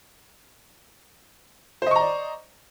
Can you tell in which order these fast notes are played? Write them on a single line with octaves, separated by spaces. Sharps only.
C5 D#5 C#6 A#5 D5